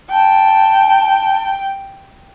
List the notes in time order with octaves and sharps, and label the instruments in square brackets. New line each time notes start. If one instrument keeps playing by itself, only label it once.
[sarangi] G5 [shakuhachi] A5